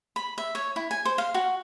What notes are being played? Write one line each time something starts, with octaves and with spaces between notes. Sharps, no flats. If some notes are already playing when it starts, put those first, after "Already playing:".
B5
E5
C#5
E4
G#5
C5
F5
F#4